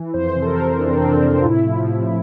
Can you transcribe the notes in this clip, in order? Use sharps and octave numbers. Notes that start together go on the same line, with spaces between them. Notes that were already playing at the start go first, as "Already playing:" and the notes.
Already playing: E3
F2 C5
C3
A4
A#4
E3
F2 D4
C4
F2 C4
D4
C3
F4
A2 E4
F3
A2